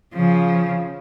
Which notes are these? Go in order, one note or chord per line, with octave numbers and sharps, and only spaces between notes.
C#3 F3